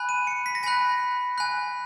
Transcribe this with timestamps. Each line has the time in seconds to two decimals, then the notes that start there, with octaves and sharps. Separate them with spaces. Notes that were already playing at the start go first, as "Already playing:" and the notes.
Already playing: G#5 B5 F#6
0.09 D#7
0.27 C#7
0.46 B6
0.55 A#6
0.63 G#5 B5 F#6 B6
1.38 G#5 B5 F#6